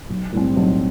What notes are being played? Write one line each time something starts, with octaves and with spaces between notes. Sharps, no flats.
B1
A2 G3 C4
B1